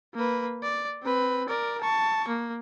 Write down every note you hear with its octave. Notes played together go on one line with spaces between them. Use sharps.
A#3 B4
D5
C4 B4
A#4 D5
A5 C#6
A#3